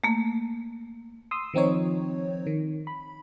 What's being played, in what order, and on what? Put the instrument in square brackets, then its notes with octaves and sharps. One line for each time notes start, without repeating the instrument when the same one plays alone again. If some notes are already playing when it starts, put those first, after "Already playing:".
[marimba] A3 A#3
[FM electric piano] C6 D#6 E6
D#3 F3 C4 D#4 C#5
D#3
B5